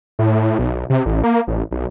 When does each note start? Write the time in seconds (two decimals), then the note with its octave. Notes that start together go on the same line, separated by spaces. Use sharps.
0.19 A2
0.59 B1
0.90 C3
1.06 A1
1.24 A#3
1.47 A1
1.71 B1